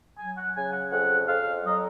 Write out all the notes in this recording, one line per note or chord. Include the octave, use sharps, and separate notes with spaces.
F#3 G#5
F#5
C#3 G#5
F#5
F2 F#5
F2 F5
F#3 D#5